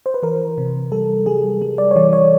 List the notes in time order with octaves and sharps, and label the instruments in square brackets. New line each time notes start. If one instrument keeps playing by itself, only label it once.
[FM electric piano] C5
B4
E3 A#4
C3
G3 A4
G3 G#4
G3
D5
C#5
E3 D5
C#5